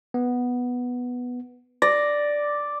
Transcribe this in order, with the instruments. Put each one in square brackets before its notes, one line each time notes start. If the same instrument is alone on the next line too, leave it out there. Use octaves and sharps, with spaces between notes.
[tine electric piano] B3
[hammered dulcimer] D5 [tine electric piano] A#6